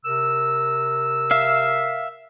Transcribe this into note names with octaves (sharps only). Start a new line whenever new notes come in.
C3 A#4 E6
E5 F5